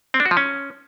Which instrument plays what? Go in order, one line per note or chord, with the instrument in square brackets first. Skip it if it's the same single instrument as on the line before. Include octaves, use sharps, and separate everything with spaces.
[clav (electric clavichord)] C4
D4
F#4
F3
C#4